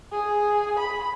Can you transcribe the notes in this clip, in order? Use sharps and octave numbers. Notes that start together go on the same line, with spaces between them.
G#4
B5